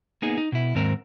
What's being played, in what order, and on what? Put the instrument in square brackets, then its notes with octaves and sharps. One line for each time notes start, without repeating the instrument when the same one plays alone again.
[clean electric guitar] A#3 B3 D#4 G#4
D#4
B2 E4
D#2 G#2 C4 A#4